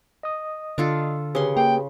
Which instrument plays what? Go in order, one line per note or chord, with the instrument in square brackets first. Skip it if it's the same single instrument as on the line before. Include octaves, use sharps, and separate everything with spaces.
[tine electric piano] D#5 D#6
[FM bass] D3 [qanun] D4 F4 A4
[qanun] C#3 C6 [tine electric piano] G4 G#4 B4
[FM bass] A#3 [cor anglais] G5